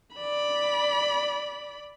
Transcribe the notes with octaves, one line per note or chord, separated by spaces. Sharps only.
D5 B5